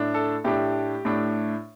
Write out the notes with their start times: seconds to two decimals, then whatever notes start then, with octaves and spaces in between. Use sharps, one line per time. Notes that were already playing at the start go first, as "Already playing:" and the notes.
Already playing: A2 A3 D4
0.14 A4
0.44 A2 A3 D4 G4
1.05 A2 A3 D4